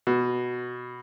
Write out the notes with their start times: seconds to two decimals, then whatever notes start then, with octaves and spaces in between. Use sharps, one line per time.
0.07 B2